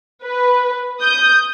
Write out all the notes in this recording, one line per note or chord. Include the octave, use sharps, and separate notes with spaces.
B4
D#6 G6